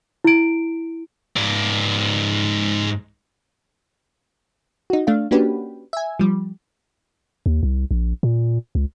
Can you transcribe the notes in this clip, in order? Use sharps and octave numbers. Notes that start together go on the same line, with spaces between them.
E4 D7
G#2 D5
D#4 F#4
A3 D4 F5
A#3 C#4 D4 F#4 G4 B4
E5 G#5
F3 G3
D#2
C2
A#1
A#2
C#2